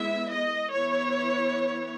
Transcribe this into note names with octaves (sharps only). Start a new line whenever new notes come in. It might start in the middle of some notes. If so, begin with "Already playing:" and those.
Already playing: G#3 B3 E4 E5
D#5
E3 B3 E4 C#5